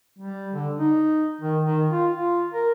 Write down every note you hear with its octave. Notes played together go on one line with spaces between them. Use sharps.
G3
D3
D#4
D#3
D#3
F4
F4
A#4